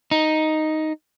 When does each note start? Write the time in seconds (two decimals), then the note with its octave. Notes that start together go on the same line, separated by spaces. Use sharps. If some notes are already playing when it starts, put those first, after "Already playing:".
0.11 D#4